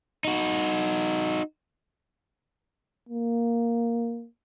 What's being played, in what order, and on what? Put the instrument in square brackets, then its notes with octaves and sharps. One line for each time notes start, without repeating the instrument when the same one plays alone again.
[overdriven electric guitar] D#4 F#4
[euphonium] A#3